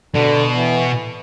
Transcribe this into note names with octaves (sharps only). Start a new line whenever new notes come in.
B2 D3
E3